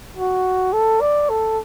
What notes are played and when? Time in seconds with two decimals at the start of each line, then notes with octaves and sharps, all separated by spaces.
0.17 F#4
0.73 A4
1.01 D5
1.30 A4